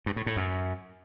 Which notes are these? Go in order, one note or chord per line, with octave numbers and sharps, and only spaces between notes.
G2
A2
A2
F#2